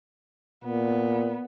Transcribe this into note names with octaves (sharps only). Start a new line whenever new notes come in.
A#2 B3